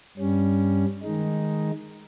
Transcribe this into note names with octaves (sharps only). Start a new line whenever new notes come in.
G2 G3 C#4
D#3 G#3 D#4